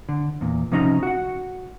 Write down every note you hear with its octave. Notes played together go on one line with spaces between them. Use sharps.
D3
E2 A#2
C3 F3 C#4 D#4 C#5 A#5
F#4 F#5